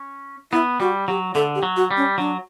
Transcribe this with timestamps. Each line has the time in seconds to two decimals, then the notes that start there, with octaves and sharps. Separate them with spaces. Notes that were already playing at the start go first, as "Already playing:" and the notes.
Already playing: C#4
0.52 B3 E4
0.80 G3 F#4
1.08 F#3 G4
1.35 D3 A4
1.55 G4
1.63 F#3
1.76 F#4
1.91 G3
1.97 C#4
2.18 F#3 D4